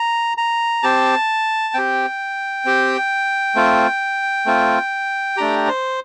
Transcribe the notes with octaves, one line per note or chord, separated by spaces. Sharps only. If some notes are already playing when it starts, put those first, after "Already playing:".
Already playing: A#5
A#5
C4 G4 A5
C4 G4 G5
C4 G4
A3 C4 F4
A3 C4 F4
A3 D4 G4 A#5
C5